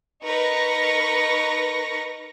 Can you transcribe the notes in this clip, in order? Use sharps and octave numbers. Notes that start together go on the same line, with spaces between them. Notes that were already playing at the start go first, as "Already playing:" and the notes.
D#4 A#4 B4 C#6 A#6